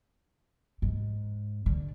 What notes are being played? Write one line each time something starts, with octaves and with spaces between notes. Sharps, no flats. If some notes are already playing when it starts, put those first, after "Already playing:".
G#2
D3